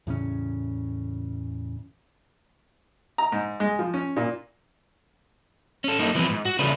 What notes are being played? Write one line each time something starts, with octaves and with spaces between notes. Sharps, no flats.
E2 A2 C#3 C#4
A#5
G#2
G#3
F3
C#4
A#2
C#4 A4
F#2 A#3 D#4 A4
E3 F3 B3 C4 B4
G#2
F#4
C#3 A3 C#4 D4 B4